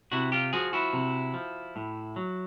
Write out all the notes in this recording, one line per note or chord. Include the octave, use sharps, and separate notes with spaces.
C3 E4 F#4
F4 G4
F3 F#4 G#4
E4 F#4
C3
F3
A2
F#3